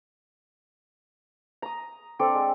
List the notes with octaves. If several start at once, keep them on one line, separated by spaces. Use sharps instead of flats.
A#5 D#6
C4 D4 A4 D5
G#3